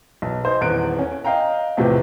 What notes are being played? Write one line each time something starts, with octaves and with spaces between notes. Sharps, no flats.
B1
D#4 C5
D#1 E2 F#6 D7
C#4
D#5 F5 G5 A#5
E2 A2 C3 E3 F3